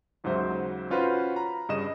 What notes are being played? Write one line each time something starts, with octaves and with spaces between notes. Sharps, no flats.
D#2 G#2 C#3 F#3 C5 E5
C#4 F4 F#4 B4 C5
A#5 B5
G2 C#3 D#5 E7